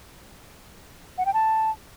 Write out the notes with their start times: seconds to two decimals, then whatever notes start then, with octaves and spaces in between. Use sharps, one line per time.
1.18 F#5
1.26 G5
1.34 A5